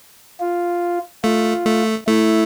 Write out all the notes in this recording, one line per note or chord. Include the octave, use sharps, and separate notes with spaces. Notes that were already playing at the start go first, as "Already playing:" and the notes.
F4
A3 F4
A3
A3 E4